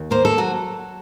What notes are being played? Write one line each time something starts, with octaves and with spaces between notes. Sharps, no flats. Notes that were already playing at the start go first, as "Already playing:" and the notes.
Already playing: D#2
A#3 C5
A4
F#3 F#4